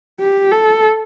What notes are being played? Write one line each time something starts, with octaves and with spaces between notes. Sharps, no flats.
G4
A4